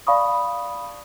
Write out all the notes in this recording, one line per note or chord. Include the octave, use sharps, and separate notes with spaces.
D5 F5 A5 B5 C#6 D#6